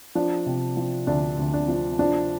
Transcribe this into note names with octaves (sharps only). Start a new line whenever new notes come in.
F3 D4
C3
F3
D2 D4
D2
D4
F3
F3 D4